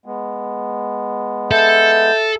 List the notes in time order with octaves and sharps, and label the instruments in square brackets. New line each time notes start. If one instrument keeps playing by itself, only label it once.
[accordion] G#3 B3
[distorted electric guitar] A4 [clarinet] E5 [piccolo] G6